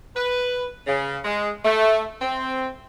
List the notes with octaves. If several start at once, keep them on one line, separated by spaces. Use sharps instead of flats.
B4
C#3
G#3
A3
C4